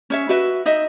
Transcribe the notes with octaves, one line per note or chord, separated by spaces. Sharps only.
C#4 C#5 E5
F#4 B4 E5
D#4 D#5 E5